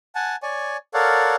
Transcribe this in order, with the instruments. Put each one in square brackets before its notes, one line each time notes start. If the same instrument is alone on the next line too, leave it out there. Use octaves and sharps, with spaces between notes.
[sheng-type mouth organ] F#5 G#5 A5
C#5 D5 G#5
A4 A#4 C#5 D5 F5 F#5